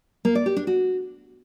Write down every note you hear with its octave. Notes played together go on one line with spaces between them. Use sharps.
A#3
D5
G4
D4
F#4